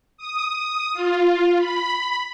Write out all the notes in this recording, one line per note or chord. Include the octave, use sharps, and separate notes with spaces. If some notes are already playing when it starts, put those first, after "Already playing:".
D#6
F4
B5